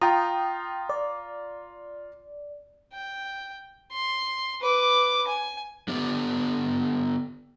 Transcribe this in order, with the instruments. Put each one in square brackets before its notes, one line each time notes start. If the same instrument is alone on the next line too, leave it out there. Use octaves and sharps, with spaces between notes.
[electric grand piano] F4 A#5 [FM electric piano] G5 D#6
[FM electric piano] D5
[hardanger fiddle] G5
C6
B4 D6
G#5
[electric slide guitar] D3 B3 G4 D5